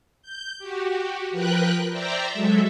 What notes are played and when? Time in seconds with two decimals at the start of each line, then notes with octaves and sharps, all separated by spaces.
0.22 G6
0.58 F#4 G4
1.31 F3 A#4 B4 G5 F#6
1.91 C5 D5 E5 G5 A#5
2.32 F#3 G#3 A4 E5